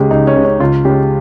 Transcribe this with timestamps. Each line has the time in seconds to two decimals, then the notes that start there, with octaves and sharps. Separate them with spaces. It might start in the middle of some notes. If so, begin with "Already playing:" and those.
Already playing: C#2 C#3 G#3 G4 G#4
0.11 C#2 D#4
0.27 C#4
0.36 C#3 G#3
0.44 C#4
0.60 C#2 F4
0.85 C#3 G#3 G4